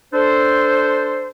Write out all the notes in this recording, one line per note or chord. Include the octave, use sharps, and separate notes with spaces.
D4 A4 C5